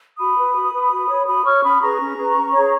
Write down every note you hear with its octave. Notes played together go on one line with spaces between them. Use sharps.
F#4 B5 D#6
B4
F#4
B4
F#4
C#5
F#4 B5 D#6
C#5 C#6 F6
C#4 B5 D#6
G#4 B4 A#5 C#6
C#4
G#4 B4
C#4
G#4 C#5